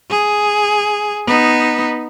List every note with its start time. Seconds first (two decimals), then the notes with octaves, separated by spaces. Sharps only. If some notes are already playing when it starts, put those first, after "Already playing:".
0.10 G#4
1.27 B3 D#4